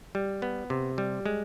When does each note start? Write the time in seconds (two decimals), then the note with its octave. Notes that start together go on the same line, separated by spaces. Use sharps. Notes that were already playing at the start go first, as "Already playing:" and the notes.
0.15 G3
0.42 B3
0.70 C3
0.98 G3
1.26 G#3